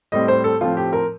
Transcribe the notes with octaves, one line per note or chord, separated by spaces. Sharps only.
A2 G3 C4 D#5
C5
A4
A2 F3 A3 C4 F4
G4
A#4